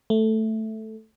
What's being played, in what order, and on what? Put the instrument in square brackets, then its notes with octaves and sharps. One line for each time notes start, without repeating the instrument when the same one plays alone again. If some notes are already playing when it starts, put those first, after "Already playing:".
[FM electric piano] A3